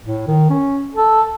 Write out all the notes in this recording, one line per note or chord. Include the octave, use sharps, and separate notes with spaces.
A2
D#3
C#4
A4